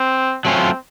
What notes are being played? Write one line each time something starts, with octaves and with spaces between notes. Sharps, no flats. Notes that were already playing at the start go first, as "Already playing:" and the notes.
Already playing: C4
F#3 A3 C4 C#4 F4